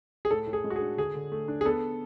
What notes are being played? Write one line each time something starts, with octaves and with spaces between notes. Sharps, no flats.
G#4
A2 A4
A2
G#4
G#3
F#4
G#4
D4
D3 G#4
D3
A3
D4
G#4
B3 A4